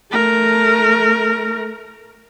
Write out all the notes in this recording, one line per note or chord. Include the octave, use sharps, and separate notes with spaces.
A3 A#4